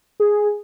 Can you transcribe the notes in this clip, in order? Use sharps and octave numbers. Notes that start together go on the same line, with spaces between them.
G#4